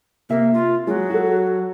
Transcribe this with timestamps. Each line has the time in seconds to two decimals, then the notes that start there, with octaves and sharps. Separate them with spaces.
0.30 C3 A#3 E5
0.53 F4
0.87 F#3 G#3
1.10 F#4 A4